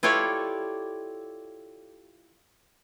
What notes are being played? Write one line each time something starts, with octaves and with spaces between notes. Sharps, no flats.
E4 F4 G4 A4 C#5 D5